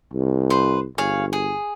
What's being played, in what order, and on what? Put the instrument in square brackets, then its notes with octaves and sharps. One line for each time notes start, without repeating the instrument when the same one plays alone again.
[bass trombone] C2
[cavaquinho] B4 C5
[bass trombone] G1 [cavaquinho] G#4 C#5 F5
[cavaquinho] G#4